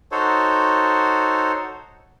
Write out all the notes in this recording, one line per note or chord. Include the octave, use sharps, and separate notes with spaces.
D#4 F#4 A4 C5 C#5